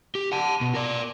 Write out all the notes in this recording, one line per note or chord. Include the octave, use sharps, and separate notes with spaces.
G4
F#5 A5
B2
A#4 D5